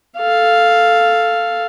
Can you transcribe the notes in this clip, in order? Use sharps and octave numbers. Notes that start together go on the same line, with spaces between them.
A4 F5